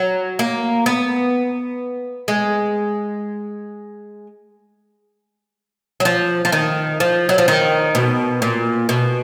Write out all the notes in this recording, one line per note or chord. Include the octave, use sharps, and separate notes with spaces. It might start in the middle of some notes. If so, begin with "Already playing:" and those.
Already playing: F#3
A#3
B3
G#3
F#3
F3
F3
D#3
F3
F#3
F3
D#3
B2
A#2
B2